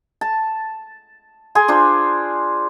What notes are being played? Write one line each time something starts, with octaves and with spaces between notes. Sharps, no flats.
A5
G#4 G#5 C6
D4 F4 C5